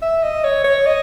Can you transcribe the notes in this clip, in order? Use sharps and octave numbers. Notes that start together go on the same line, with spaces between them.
E5
D#5
C#5
C#5
D#5